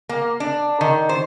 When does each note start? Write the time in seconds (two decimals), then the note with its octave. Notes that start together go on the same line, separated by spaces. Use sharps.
0.09 A#3
0.40 D4
0.81 D#3
1.09 C5